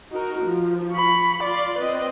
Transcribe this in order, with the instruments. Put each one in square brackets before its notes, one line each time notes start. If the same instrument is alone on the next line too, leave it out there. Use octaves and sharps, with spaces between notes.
[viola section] D#4 F#4 A#4
F3
[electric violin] B5 C#6
[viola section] F4 C6 [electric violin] D5
[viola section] C4 [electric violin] B4 D#5